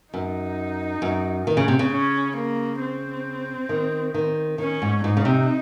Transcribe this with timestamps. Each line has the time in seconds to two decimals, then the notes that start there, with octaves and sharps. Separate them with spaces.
0.13 F#2 D#4
1.02 F#2
1.47 D#3
1.57 C#3
1.68 C3
1.79 C#3
1.92 C#4
2.36 A#3
2.80 C4
3.69 D#3
4.14 D#3
4.58 D#3 C#4
4.82 G#2
5.04 G#2 D#4
5.17 C#3
5.25 C3